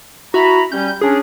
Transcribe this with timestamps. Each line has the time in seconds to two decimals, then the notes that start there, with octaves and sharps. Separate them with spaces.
0.34 E4 F#4 A#5 B5
0.72 G3 C#4 G6
1.01 C#4 D4 G#4